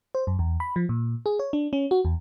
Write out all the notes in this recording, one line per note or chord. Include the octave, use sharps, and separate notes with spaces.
C5
F#2
E2
B5
F3
A#2
G#4
C#5
D4
C#4
F#4
E2